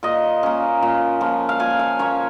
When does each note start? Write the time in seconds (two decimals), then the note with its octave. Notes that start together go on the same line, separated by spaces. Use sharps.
0.03 A#2 D#5
0.43 A#3 C#4
0.82 A#2
1.21 F3 A#3
1.49 F5
1.60 A#2 G#5
1.79 F5
1.99 A#3 C#4 C#5